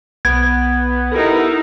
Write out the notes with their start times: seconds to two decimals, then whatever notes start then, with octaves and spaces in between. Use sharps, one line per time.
0.25 B1 B3 G#6
1.12 D#4 E4 G4 A4 A#4